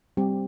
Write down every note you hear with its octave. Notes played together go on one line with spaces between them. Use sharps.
G3 C4 G4